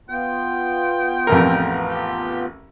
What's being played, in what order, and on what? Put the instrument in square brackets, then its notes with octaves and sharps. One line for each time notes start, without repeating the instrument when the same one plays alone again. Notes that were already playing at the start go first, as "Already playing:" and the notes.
[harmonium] B3 F4 [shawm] G5
[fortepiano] A1 F2 A#4
[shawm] G4